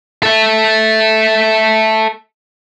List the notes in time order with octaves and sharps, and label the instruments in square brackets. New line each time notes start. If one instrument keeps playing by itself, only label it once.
[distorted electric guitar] A4 E5